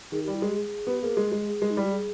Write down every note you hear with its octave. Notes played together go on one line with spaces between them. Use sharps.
D#3 G#4
G4
G3
E4
G#3 G4
G#4
B3 G4
A#3 G#4
G#3
G#3
G#4
G#3
D#4
G3 E4
G4
G#4